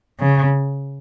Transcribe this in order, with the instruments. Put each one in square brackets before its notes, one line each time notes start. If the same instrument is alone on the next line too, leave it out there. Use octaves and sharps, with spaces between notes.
[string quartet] C#3